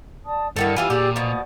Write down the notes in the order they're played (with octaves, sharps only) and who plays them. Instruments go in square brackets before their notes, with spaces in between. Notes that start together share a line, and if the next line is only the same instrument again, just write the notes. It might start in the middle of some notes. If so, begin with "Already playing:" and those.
[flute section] D5 A5 D#6
[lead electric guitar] G2 [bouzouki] D3 D#3 A4 [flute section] E4 A#4
[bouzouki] G3 F4 G#5 [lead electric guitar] E4 B4 [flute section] E6
[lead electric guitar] A#2 [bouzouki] G4 G#4 D5
[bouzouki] B2 F3 [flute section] D5 D#6